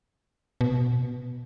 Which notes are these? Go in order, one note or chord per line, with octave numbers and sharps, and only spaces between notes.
B2